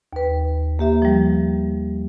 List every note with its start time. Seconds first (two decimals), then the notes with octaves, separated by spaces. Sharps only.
0.13 D#2 B4
0.79 A#3 G4 E5
1.02 F3 G3